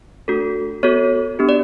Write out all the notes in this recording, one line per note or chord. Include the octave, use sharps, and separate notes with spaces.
A3 D4 F#4 A4
B3 F#4 A4 C#5
B3 D4 G4
D5